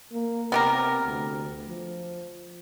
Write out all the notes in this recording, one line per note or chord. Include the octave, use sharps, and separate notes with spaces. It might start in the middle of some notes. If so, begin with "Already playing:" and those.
A#3
C3 B3 G4 A#4
D2
F3